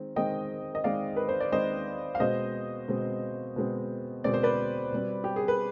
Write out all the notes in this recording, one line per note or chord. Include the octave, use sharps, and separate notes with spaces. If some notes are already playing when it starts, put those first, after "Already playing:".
Already playing: D#3 G#3 C4
D#3 G#3 C4 D#5 G5
D#5
D#3 G#3 C4 D5 F5
B4
C5
D5
D#3 G#3 C4 C5 D#5
F5
B2 G#3 C4 C5 D#5
B2 G#3 C4
B2 G#3 C4
B2 G#3 C4 D5
C5
B4 D5
B2 G3 C4
G4
G#4
B4